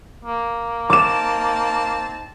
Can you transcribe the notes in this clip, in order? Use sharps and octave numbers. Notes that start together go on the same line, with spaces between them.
A#3
C4 D#4 A5 D6 E7